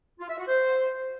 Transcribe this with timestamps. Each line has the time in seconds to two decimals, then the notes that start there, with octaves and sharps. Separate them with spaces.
0.20 F4
0.29 E5
0.38 F#4
0.48 C5